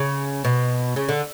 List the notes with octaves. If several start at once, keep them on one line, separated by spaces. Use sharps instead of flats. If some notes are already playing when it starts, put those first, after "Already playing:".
Already playing: C#3
B2
C#3
D3